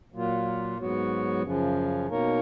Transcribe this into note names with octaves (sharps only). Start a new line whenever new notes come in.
A#2 F#3 A#3 F4
G#2 F#3 B3 F#4 C#5
F#2 C#3 F3
B2 A#3 D#4 A#4 C#5